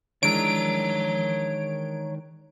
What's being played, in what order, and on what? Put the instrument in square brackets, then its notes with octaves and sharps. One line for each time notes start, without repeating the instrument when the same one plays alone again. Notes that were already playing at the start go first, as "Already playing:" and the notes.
[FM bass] D#3 [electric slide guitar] E3 G#3 D4 [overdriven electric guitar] C#5 A#5 [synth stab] D7